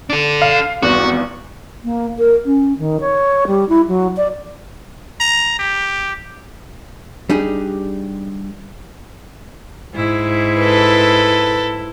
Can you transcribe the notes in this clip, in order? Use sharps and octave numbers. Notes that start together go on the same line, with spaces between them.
D4 A4
F5
G#1 E2 G2 F#4
A#3
A#4
C#4
D#3
C#5
G3
E4
F#3
D5
A#5
G4
G3 D4 D#4 G4 G#4
G#2 E4
A4 B4